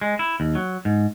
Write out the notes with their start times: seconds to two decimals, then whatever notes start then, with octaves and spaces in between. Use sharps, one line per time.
0.02 G#3
0.19 E4
0.40 D#2
0.55 F#3
0.85 G#2